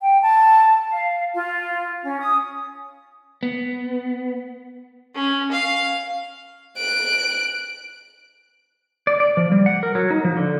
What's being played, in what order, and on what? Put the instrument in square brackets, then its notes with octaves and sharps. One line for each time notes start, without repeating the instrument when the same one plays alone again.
[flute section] G5
A5
F5
F4
C#4
D#6
[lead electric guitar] B3
[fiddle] C#4
F5
[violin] F#6 D7
[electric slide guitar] D5
D5
F3
G3
F#5
A#4
F#3
D#4
F3
D3